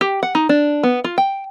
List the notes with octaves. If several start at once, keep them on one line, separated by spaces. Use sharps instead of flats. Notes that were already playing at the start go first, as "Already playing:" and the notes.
G4
F#5
D#4
D4
B3
F4
G5